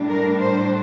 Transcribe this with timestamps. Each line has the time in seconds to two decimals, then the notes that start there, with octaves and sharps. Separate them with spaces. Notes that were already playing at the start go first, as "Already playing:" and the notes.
Already playing: A2 G3 D4
0.08 A#4
0.39 C5